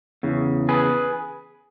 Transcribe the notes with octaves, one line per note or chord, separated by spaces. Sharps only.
E2 C#3
G#4 B4